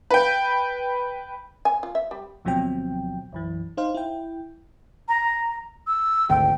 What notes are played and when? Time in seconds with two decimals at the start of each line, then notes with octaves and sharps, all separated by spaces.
0.11 B4 G5
1.65 G#5
1.83 F4
1.95 E5
2.11 G3
2.45 D2 B2 F3 F#3 C4 G5
3.33 B1 F#2 E3
3.77 D#4 C5 F5
3.94 E4 G5
5.08 A#5
5.87 E6
6.29 G#1 D2 G5